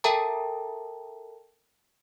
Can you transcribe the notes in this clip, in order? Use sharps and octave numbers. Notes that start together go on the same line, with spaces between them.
A4 A#4 E5 G5 A5 A#5